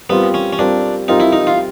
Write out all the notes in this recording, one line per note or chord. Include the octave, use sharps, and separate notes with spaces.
G3 B3 C4 F4 A#4
C#4
C#4
G3 C4 D4 F4 A#4
G3 C4 D#4 F4 A#4
E4
D#4
F4